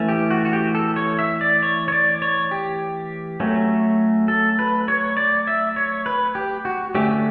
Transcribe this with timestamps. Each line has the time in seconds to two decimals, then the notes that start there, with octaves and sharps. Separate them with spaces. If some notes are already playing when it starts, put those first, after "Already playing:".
Already playing: E3 A3 C#4
0.09 G4
0.31 F#4
0.45 F#4
0.53 G4
0.75 A4
0.96 C#5
1.19 E5
1.41 D5
1.63 C#5
1.88 C#5
1.92 D5
2.22 C#5
2.51 G4
3.40 F#3 A3 C#4
4.28 A4
4.59 B4
4.88 C#5
5.17 D5
5.47 E5
5.76 C#5
6.06 B4
6.35 G4
6.65 F#4
6.95 D3 A3 C#4 G4